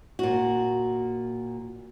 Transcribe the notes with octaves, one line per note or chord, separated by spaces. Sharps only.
A#2 F#4